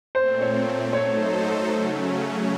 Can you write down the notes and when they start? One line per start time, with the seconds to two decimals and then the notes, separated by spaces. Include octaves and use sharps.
0.15 A#2 A3 C4 C5
0.41 C#5
0.93 F#3 A3 D#4 A4 C5 C#5
1.71 C#3 F#3 A3 C#4